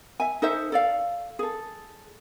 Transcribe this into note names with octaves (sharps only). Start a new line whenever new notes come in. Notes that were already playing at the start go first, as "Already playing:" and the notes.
E5 G#5
D#4 A4 C5 E5
A4 D5 F5
G#4 A4